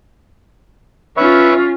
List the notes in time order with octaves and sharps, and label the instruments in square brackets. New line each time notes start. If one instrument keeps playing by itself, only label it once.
[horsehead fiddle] C#4 F4 [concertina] B4 C#5 E5